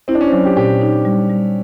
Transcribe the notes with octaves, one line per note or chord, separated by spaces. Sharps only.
C4 E4
D4
C#4
C4
F#3 C#4
G4
A#2 G4
D#4
G3
G3